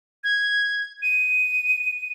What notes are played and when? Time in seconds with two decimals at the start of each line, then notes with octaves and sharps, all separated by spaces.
0.24 G#6
1.02 D#7